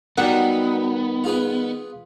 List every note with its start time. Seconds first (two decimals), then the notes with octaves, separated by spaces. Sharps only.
0.18 D#3 F#3 G3 B3 F#5
1.24 F4 G#4 B4